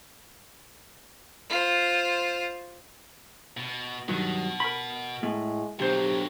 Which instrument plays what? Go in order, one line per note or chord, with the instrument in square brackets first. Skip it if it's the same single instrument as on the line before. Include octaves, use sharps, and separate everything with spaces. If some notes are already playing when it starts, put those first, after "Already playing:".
[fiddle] F4 C5
[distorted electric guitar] B2
[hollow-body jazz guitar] G2 D#3 F#3 [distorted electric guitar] B2
[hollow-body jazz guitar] A#4 B5
[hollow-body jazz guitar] A2 A3 [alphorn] G#3
[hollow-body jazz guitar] B1 C5 [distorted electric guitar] D3 F#3 [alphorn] G4